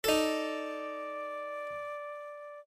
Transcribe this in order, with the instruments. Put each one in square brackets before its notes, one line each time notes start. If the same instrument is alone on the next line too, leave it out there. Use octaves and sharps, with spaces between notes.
[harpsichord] D#4 A4 [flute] D5